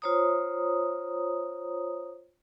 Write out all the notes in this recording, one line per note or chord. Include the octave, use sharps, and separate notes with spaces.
F4 C5 C#5 A#5 D#6